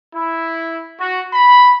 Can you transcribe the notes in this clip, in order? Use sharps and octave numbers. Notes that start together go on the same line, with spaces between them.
E4
F#4
B5